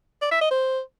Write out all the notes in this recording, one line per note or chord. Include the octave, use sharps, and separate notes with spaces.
D5
E5
D#5
C5